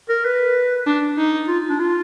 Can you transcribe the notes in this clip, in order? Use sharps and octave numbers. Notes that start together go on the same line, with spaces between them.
A#4
B4
D4
D#4
F4
D4
F4